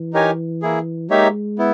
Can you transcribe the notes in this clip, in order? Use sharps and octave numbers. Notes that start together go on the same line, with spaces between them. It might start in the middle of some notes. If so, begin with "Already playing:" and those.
Already playing: E3
D#4 G4 A#4 C#5 G#5
A#3 E4 G#4
G#3 A#3 D#4 G4 C#5 E5
B3 E4